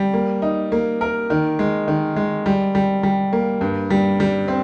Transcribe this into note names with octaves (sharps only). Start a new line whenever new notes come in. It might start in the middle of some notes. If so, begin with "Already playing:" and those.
Already playing: G3
A#3
D#4
A#3
A#4
D#3
G#3
D#3
G#3
G3
G3
G3
A#3
G2
G3
G3
C4